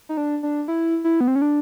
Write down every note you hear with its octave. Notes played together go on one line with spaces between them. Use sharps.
D#4
D4
D4
E4
E4
B3
C4
C#4
D4